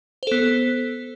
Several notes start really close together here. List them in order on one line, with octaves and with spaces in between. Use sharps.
C5 A4 B3